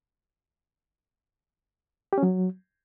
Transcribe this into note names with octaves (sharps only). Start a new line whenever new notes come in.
G4
C#4
F#3